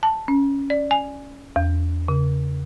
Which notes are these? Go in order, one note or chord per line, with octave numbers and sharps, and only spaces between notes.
A5
C#4
D5
G#5
E2
C#3